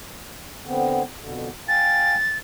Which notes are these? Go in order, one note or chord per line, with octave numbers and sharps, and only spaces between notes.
D3 B3 C4
F2 B2 D3
F5 G5 G#5 A6